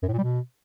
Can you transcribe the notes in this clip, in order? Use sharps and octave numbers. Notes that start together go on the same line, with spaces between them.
F#2
A2
A#2
G3
B2